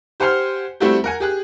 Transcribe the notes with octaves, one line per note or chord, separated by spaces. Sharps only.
G4 C5 F#5 G#5 C6 F6
G3 A3 C4 E4 F#4 G4
A#4 F#5 G#5
G4 G#4 F#6